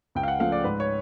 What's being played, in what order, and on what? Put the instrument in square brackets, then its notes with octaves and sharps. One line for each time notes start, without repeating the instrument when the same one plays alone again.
[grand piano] C#2 G5
F5
F#5
C#3 F3 A3 F5
D5
G#2 B4
C#5